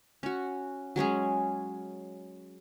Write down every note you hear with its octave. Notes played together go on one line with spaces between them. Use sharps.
C#4 F#4
F#3 G#3 C#4 G#4